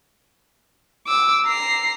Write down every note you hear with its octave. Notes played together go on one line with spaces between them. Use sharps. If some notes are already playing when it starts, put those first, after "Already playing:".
D6 E6
A#5 C7